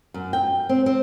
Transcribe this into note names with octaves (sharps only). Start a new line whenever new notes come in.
F#2
G5
C4
C4